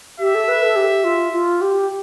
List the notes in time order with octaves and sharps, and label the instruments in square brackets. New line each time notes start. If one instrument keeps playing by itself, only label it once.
[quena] G4 [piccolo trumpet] E5
[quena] A4
B4
A4
G4
F4
F4
G4